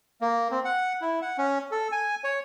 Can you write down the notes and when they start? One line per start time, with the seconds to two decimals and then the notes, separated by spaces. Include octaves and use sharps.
0.21 A#3
0.51 C4
0.65 F#5
1.01 E4
1.22 F#5
1.38 C#4
1.71 A4
1.92 G#5
2.24 C#5